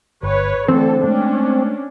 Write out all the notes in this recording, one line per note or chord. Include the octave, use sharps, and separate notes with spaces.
G1 B4 C#5
D3 E3 A3 C4 A4
G#3 A3 C#4 D4